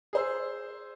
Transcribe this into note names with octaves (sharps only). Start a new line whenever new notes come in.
G#4 C5 E6